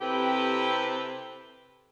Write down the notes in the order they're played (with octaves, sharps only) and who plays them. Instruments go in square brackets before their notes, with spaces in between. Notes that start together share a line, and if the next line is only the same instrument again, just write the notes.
[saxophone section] C3 C4 E4 G4 A4 B4